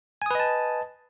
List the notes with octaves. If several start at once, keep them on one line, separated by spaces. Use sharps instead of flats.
B4 D#5 G#5 A5 D#6